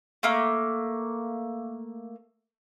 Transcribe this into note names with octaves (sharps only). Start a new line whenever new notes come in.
A3 A#3